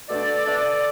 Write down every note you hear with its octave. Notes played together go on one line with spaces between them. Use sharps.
B2 A3 D4 A4 D5
B2 A3 D4